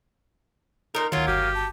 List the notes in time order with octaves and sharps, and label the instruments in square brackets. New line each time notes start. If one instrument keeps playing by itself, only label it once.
[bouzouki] A#2 A#4 [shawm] D#4
[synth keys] D2 D#3 [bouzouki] F#3 A#3 [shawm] F4
[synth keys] G1 F#4 D#7 [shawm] G4 [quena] F6
[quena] A5